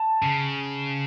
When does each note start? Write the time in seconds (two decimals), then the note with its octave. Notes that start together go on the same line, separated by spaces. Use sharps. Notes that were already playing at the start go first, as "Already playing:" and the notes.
Already playing: A5
0.23 C#3